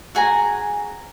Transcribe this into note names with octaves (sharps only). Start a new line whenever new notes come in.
F#4 G#4 G#5 A#5